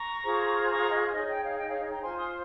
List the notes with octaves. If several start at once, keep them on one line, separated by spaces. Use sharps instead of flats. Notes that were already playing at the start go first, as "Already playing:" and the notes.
Already playing: A#5 C#6
F4 G#4 C5
A#5 C#6
D#5
D#4 G#4 C#5 D#5
D#5 G5
C#5 F5
D#5 G5
C#5 F5
D#5
G5 A#5
F4 C5 G#5 C6
C6 D#6